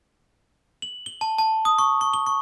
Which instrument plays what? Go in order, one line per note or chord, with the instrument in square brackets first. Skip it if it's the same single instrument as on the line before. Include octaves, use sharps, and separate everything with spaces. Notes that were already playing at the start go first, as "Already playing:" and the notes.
[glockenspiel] F#7
G7
A5
A5
D#6
C#6
C#6
G7
C#6